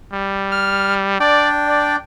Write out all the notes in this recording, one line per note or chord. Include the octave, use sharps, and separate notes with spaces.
G3
F6
D4 D5 G5
D5